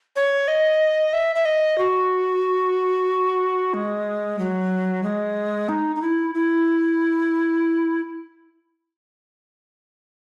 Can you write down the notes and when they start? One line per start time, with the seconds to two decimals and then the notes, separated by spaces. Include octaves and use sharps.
0.16 C#5
0.48 D#5
1.13 E5
1.35 E5
1.45 D#5
1.78 F#4
3.74 G#3
4.39 F#3
5.03 G#3
5.69 D#4
5.96 D#4
6.02 E4
6.35 E4